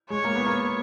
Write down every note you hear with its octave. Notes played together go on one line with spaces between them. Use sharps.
G#3 C#5
A#3
B3
A#3